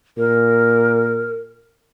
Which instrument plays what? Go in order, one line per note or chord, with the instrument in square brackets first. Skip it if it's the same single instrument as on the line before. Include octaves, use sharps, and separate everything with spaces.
[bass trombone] A#2 [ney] A#4